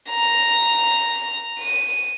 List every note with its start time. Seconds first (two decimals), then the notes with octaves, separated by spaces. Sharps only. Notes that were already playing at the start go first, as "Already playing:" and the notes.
0.11 A#5
1.59 D#7